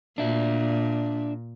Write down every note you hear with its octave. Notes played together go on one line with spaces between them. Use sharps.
A#2 D4 E5